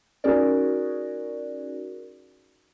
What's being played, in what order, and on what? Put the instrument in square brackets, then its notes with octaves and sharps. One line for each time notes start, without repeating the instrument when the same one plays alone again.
[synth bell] C#4 D#4 F#4 G#4 A#4 D5